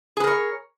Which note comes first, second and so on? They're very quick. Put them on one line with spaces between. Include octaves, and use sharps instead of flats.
G#4 B4 A#4 C#5